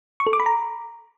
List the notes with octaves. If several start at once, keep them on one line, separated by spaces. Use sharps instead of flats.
C#6
A4
D6
B5
A#5